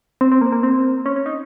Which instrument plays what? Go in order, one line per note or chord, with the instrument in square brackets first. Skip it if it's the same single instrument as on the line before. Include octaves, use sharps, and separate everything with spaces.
[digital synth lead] C4
C4
A#3
A#3
C4
C#4
C#4
D#4